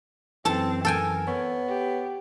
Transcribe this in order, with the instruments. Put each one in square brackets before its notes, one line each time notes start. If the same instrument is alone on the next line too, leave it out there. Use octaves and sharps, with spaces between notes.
[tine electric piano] F#2 E3 [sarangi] C4 [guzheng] A4 A5
[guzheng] A4 G5 G#5 [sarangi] A#4
[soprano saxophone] B3 [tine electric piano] C#5
[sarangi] G4